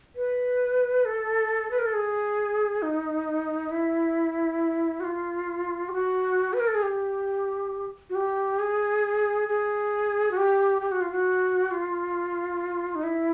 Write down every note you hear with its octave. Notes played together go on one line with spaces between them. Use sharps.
B4
A4
B4
A#4
A4
G#4
D#4
E4
F#4
F4
G4
F#4
B4
A#4
A4
G#4
G4
F#4
G4
G#4
G#4
F#4
G4
G4
F#4
F4
F#4
F4
D#4
E4